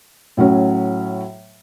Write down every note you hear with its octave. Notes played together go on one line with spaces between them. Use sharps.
A2 F#3 C#4